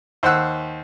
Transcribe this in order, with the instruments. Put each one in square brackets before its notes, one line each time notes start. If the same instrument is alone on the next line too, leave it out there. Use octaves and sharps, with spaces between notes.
[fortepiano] D#2 C5 F#5 E6 F#6